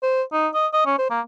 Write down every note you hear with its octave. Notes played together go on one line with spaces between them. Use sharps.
C5
D#4
D#5
D#5
C#4
C5
A#3